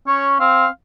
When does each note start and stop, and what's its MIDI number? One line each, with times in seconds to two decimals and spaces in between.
0.08 0.39 61
0.08 0.31 73
0.40 0.66 60
0.40 0.68 77